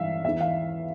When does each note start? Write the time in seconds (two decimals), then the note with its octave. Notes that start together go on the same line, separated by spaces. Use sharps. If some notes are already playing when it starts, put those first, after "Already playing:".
Already playing: G2 E3 E5 F5
0.25 E2 E3 E5
0.40 F5